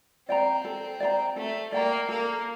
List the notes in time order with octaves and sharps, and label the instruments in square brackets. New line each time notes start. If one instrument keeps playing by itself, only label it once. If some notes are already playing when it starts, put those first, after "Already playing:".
[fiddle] C4 [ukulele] D5 G5 A#5
[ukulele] A4
D5 G5 A#5
[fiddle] A3 [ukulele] A4
[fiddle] A#3 [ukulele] D5 G5 A#5
[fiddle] A#3 [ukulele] A4